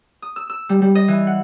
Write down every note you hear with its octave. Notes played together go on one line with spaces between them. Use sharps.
D#6
E6
E6
G3
G3
D#5
E3
F#5